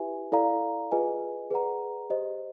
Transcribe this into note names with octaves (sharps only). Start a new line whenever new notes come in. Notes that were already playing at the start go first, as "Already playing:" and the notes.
Already playing: E4 G4 B4 E5 G#5
E4 A4 D5 F5 A#5
F4 G#4 B4 D#5 G#5
G#4 B4 D5 F#5 A#5
G4 C5 D#5